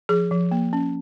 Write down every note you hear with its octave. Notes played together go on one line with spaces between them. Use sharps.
F3 G#4
F3
A#3
C#4